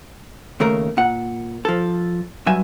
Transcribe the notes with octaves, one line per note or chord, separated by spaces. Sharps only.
D#2 C#3 A3 A#4
A#2 F#5
F3 A4
G2 F#3 E5 G#5